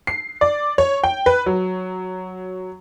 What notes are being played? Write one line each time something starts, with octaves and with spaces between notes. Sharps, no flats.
C7
D5
C#5
G5
B4
F#3